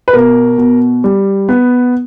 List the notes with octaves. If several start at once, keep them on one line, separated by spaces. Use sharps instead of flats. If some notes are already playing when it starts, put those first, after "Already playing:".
B4
B2 A#4
B2
G3
B3